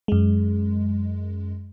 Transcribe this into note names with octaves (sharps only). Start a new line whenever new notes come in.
F#2 G#3